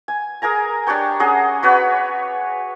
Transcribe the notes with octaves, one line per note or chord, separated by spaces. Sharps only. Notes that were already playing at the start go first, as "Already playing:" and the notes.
G#5
G#4 A#4 G#5 A#5
D4 G4 C#5 G5
C#4 G#4 D#5 F#5
F#4 B4 C#5 D5